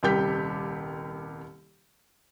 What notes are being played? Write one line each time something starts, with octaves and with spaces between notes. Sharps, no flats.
D#1 C2 G3 G4 G6 B6